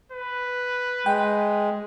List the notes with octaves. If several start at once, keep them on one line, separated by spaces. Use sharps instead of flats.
B4
G#3 G5